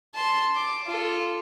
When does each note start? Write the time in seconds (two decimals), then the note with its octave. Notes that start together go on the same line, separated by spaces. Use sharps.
0.15 A5 C6
0.56 D6
0.86 F4 A4